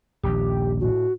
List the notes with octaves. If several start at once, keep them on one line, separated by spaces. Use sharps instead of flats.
D#1 A#1 G4
A2 F#4